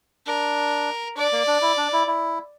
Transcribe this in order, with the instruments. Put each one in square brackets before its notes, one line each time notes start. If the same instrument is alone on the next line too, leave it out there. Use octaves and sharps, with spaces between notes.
[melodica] D4 [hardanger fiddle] A#4
[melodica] D4 [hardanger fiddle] D5
[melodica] A#3
D4
E4
D4
E4
E4